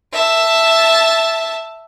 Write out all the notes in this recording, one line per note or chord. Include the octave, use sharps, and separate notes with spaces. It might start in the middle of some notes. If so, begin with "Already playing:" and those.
E5 A5